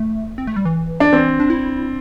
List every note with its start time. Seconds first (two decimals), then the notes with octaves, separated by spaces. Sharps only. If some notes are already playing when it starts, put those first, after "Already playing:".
Already playing: A3
0.38 C4
0.47 A3
0.56 G3
0.65 E3
1.00 D4
1.13 E3 C4
1.40 D4
1.50 E4